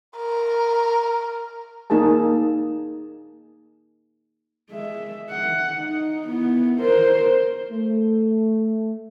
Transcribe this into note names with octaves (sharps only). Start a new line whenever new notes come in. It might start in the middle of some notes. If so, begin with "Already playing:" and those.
A#4
A#3 D#4 G#4 A#4 A5
G#3 E5
F#5
D#4
B3 E4
A#4 C5
A3